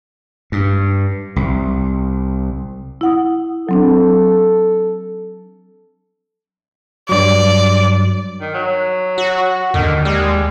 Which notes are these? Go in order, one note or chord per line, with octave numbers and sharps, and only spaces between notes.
G2
C2
E4 F#5 D#6
F#3 C4 D4 A4
G2 F#3 D5
D#3
F#3
F#4
D#2 D3 D#3
G3 G#3